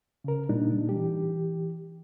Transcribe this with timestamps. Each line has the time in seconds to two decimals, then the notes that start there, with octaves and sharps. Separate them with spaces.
0.24 C#3 A#4
0.49 A#2 G3 D4 D#4
0.89 E3 G4